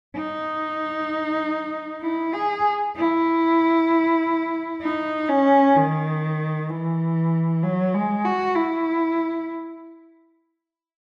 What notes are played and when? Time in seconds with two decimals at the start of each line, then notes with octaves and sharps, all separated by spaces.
0.16 D#4
2.02 E4
2.33 G#4
2.96 E4
4.82 D#4
5.29 C#4
5.76 D#3
6.70 E3
7.63 F#3
7.94 G#3
8.25 F#4
8.55 E4